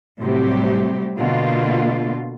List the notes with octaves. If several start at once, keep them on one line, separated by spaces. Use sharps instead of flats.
A2 C3 F#3 G3 C4 G4
B2 D3 A#3 F4